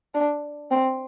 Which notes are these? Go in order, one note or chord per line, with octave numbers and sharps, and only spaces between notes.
D4
C4